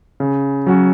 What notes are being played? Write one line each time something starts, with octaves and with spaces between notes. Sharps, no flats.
C#3
F#3 C#4 F#4